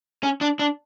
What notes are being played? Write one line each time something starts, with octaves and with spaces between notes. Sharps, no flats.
C#4
D4
D4